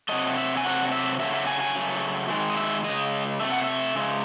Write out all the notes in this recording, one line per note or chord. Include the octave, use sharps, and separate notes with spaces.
C3 F#3 A3 D#5
E5
G#5
C3 F#3 A3 F#5
E5
C#3 F#3 A3 E5
E5
G#5
G#5
C#3 F#3 A3
D#3 G#3
D#5
E5
C#3 G#3 D#5
C3 D#3 A3 E5
F#5
E5
C#3 G#3